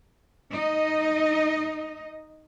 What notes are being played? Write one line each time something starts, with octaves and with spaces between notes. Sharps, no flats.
D#4 D#5